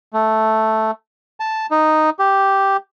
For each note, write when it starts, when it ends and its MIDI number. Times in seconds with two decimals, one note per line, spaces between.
0.13 0.91 57
1.40 1.66 81
1.71 2.10 63
2.19 2.77 67